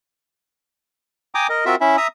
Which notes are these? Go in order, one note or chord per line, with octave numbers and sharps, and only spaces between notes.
G5 G#5 A#5 D6 D#6
A#4 D#5
C4 F4 F#4 A#4 E5
C#4 E4 E5
E5 A#5 D#6 E6